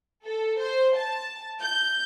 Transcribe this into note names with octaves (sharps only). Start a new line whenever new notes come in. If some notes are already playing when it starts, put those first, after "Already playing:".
A4
C5
A5
G6